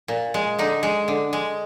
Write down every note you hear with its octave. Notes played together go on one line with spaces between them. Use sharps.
A#2
G#3
D3 D#4
G#3
D3
G#3